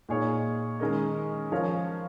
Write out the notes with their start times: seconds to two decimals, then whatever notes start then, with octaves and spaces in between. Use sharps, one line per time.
0.09 A#2 A#3 D#4 G#4 C#5
0.80 D#3 G#3 C#4 A#4 D#5
1.52 F3 C#4 A#4 C#5 F5